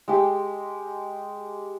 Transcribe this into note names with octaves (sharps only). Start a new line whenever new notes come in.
G#3 G4